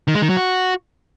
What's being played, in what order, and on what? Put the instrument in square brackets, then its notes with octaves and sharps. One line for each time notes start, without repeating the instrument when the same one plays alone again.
[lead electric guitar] D#3
G#3
D#3
F#3
F#4